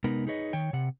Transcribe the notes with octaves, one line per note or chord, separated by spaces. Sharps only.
C3 G#3 B3 D#4 A#4 B4
D#4 G#4 B4 C#5 D#5
D#3 C#5 G5
C3 F#5